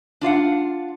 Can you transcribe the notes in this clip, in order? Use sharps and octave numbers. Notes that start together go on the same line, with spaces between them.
D4 F4 F5 F#5